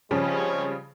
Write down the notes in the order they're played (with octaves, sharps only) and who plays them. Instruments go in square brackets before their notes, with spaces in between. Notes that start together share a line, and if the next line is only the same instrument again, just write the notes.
[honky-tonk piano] C#3 F3 G3 [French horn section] G#3 C4 C#4